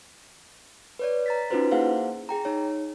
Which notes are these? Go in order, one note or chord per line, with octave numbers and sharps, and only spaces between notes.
B4 C#5 D5
A#5 A6 B6
C#4 D#4 F4 F#4 B4 C5
A#3 E4 G#4 C5 F5 F#5
G#4 G5 A#5
D#4 C#5